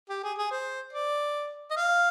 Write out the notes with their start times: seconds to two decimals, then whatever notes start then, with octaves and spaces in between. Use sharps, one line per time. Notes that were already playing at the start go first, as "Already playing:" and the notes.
0.09 G4
0.23 G#4
0.38 G#4
0.51 C5
0.93 D5
1.70 D#5
1.76 F5